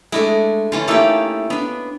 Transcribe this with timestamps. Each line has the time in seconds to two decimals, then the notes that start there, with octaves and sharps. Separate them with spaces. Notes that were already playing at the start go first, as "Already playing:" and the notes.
0.12 G#3 A3 D4 E4
0.72 D3 E3 C#4 F4
0.88 A3 A#3 D#4 E4 G4
1.50 B3 D4